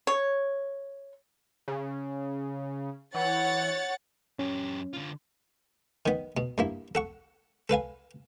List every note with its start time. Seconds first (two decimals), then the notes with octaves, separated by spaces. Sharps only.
0.07 C#5
1.68 C#3
3.15 E3 C#5 F#5 A6
4.39 F#2 C#4 G4
4.93 D3 F4
6.06 D#3 B3
6.37 B2
6.58 G2 A#3 E4
6.95 A4 F#5 C#6
7.69 A4 B4 F5 G#5